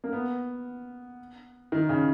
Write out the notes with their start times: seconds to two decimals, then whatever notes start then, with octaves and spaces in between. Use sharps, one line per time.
0.04 A#3
0.13 B3
1.72 D#3
1.89 C#3